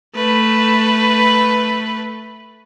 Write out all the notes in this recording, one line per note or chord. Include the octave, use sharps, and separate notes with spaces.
A3 B4